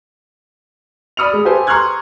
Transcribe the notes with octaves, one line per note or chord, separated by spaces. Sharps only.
D5 B5 D#6 F6 C#7 F7
G#3
G4 A4 B4 C5 G#5
A#5 C6 C#6 F6 F#6 G#6